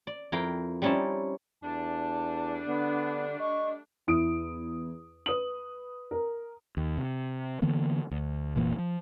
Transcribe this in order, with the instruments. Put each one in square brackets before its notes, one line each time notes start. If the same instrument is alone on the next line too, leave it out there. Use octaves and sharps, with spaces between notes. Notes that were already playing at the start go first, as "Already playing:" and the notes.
[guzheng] D5
F2 E4 A#4 F5 G5 A#5
G3 C4 C#4 D#4 E4 A5
[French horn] E2 [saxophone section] G3 A3 D4 [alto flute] A5
[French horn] D3 [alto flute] B3
[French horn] D#5 [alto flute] C#6
[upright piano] E2 E4 D#6 D7
B4 D#6 F#7
A#4
[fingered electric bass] D#2
C3
D3 E3 A#3 B3
D2
F1 A#2 E3 A#3
F3